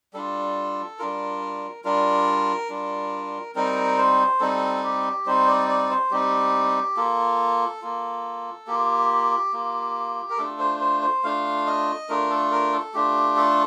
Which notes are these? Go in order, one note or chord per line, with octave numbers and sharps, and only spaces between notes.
G3 D4 F4 A4
G3 D4 F4 A#4
G3 D4 F4 A#4
G3 D4 F4
G3 C4 D#4 A#4
C5
G3 C4 D#4 A4
G4
G3 C4 D#4 C5
D5
D5
C5
G3 C4 D#4 G4
A#3 F4 A4
A#3 F4
A#3 F4 G4
A#3 F4
A#4
A3 D4 F4 A4
C5
C5
C5
A3 D4 F4 F5
D#5
A3 D4 F4 A#4
A4
A#4
A4
A3 D4 F4 G4
A4